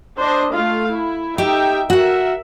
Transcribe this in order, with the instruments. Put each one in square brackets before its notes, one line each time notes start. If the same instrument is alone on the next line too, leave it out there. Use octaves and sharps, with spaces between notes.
[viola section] D4 C5 D#5
A3 F4 F5
E4
[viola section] D#4 E5 G5 [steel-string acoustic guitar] G4
[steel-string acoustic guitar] F#4 F#5 [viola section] A#4 E5